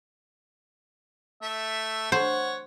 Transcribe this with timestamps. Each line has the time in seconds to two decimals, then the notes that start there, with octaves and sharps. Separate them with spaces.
1.43 A3 E5
2.12 C5 C#5 F#5